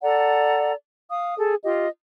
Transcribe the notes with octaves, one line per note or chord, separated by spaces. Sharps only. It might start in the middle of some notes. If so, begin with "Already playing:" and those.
A4 D5 F#5 A#5
F5 D#6
G#4 A4
F4 G4 D#5